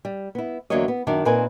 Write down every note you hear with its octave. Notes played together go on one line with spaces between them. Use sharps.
G3
B3 E4
E2 D3 F#3 A#3 C#5 D#5
B3
F#2 D#3 D4
A#2 C4 D#4 A#4 B4 G#5